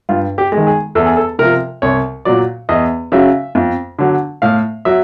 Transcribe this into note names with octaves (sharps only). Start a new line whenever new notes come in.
G2 F4
G4
G#3
D#3
G#4
E2 A4
G#4
A4
C3 F3 A#4
C2 C#5
A#2 F#3 D5
E2 D#5
C#3 F#3 E5
F2
D3 F#3
A2 F5
F#3 E5